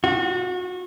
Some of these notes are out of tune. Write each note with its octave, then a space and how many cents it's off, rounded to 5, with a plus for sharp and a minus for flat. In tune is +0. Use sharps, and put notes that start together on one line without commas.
F#4 -30